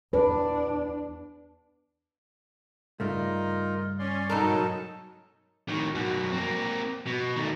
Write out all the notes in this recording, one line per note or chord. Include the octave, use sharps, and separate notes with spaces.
E2 D4 B4
G2 C#3 A3 D#4 F4 A#4
C#4 D5 C6
G#2 B2 F#3 D#4 A4 A#4 A5
A2 D#3
F#2 B2
A#3 C4
B2
D#3 A3